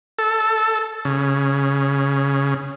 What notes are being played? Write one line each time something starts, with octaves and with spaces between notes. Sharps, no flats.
A4
C#3